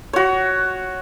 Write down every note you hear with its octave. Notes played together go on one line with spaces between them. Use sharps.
F#4 C#5